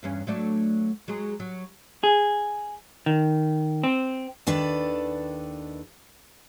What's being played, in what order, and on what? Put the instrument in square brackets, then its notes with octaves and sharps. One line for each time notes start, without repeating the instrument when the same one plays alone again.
[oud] E2 G2 C#4
F#3 A3 D4
F#3 G#3 G#4
F#3
[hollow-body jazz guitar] G#4
D#3
C4
[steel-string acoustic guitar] D#2 D#3 D4 A4 B4